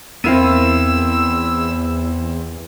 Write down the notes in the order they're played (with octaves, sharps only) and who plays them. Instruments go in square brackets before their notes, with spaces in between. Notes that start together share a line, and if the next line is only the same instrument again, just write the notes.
[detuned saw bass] E2 [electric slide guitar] B3 A#4 F5 [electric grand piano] C4 E4 D#7 [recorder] E6